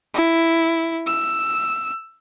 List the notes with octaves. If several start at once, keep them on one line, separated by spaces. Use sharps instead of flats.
E4
E6